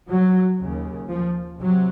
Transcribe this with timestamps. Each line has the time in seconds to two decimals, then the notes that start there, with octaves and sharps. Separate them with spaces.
0.09 F#3
0.60 D#2 C#3
1.10 F3
1.59 C3 F#3